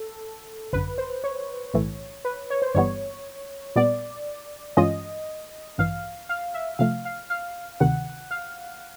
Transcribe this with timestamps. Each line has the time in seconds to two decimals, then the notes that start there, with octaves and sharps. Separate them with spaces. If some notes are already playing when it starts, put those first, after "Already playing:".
Already playing: A4
0.73 G#1 F#2 D3 B4
0.98 C5
1.24 C#5
1.74 B1 A2 E3 A3
2.25 B4
2.50 C#5
2.62 C5
2.75 G1 G2 E3 G3 B3 C#5
3.76 A#2 G3 B3 D5
4.77 G2 E3 G#3 C#4 F4 D#5
5.78 A1 G2 E3 F5
6.29 F5
6.54 E5
6.79 C3 F3 A3 F5
7.05 F5
7.30 F5
7.80 D2 C3 D#3 F#5
8.31 F5